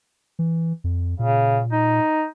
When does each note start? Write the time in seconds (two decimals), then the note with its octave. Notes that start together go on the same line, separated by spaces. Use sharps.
0.39 E3
0.84 F2
1.19 A#2 C#3
1.72 D#4